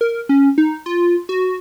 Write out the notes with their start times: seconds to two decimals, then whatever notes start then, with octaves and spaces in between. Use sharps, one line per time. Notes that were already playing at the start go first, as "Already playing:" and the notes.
0.01 A#4
0.29 C#4
0.58 D#4
0.86 F4
1.29 F#4